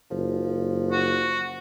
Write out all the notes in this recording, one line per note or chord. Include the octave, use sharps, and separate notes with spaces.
F#1 F3
F#4